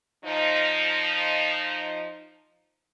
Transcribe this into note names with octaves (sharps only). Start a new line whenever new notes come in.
F3 D#4